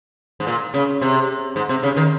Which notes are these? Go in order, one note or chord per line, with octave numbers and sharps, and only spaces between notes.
G#2
A#2
C#3
C3
G#2
C3
C#3
D#3